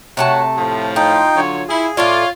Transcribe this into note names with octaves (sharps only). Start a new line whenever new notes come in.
C3 A3 F#4 C#5 F#5 A5
A2 F3
D#4 F4 G5
D3 F#3 C#5
E4 G#4
A2 F4 A4 C#5 D5